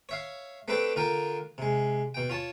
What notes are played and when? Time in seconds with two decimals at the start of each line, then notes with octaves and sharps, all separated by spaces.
0.09 C#5 E5 F5
0.68 A3 C4 D4 A4 B4 G5
0.96 D3 F4 A#4 G5
1.58 C3 G#3
2.14 B2 G5
2.30 F4 C#5 A5